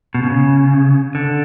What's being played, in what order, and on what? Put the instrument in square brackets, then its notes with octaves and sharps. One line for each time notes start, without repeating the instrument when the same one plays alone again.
[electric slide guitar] B2
C#3
D3